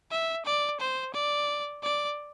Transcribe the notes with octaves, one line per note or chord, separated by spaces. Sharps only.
E5
D5
C5
D5
D5